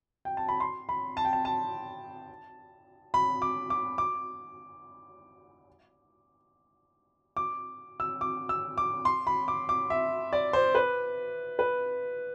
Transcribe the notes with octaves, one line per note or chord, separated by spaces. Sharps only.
G5
A5
B5
C6
B5
A5
G5
A5
A5
B5
D6
D6
D6
D6
E6
D6
E6
D6
C6
B5
D6
D6
E5
D5
C5
B4
B4